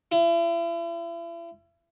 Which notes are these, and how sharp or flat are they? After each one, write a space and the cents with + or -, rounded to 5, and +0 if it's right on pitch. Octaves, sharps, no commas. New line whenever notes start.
E4 +40